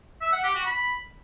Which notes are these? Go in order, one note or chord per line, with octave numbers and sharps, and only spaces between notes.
E5
F#5
G4
F#4
B5